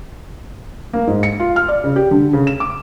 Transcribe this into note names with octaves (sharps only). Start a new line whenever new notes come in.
A#3
G#2
C#7
F4
F6
D5
C#3
G4
D3
C#3
E7
D6